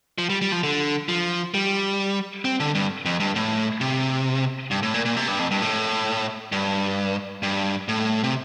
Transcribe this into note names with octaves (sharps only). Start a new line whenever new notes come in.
F3
G3
G3
F3
D3
F3
G3
C4
D3
G2
F2
G2
A2
C3
G2
A2
A#2
A#2
C3
G2
F2
G2
A2
G2
G2
A2
C3